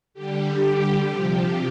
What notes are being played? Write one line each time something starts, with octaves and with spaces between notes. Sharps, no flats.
D3 G3 G4
G4
C3 F3 G4